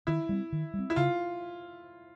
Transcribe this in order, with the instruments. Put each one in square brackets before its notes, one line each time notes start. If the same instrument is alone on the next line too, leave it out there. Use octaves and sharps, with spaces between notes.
[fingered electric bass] D#3 [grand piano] E4
[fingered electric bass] G3 C4
D#3
G3
C4
[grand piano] E4
[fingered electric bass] C#3 [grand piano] F4